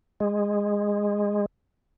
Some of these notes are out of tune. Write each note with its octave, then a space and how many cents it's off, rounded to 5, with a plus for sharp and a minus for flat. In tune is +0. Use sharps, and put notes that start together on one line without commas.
G#3 -15